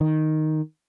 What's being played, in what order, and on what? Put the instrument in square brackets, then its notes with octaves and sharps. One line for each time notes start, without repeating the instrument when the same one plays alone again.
[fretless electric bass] D#3